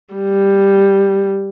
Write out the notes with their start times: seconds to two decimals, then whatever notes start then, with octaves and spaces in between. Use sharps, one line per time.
0.15 G3